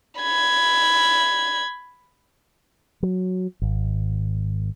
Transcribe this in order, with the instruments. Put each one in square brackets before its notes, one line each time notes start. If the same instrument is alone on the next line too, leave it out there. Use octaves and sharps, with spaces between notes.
[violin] B5 G#6
[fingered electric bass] F#3
G#1